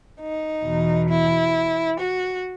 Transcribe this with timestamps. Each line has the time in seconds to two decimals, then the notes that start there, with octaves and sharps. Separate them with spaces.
0.20 D#4
0.64 E2 B2
1.09 E4
1.98 F#4